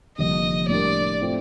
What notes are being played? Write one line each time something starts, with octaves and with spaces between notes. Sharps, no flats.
F1 F2 D3 G3 A#3 D#5
A2 G3 D4 G4 A#4 D5
A2 A3 C4 F4